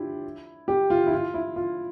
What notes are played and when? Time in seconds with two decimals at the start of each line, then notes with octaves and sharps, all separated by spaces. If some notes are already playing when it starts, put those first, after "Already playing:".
Already playing: D4 E4 F4 G4
0.68 G4
0.90 F4
1.07 E4
1.13 F4
1.34 E4
1.56 F4